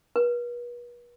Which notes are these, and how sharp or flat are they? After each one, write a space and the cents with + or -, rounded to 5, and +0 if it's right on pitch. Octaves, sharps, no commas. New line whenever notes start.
B4 -40